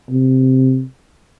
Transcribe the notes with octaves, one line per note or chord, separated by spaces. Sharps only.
C3